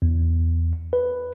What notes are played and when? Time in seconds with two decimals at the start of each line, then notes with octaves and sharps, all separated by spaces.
0.02 E2
0.93 B4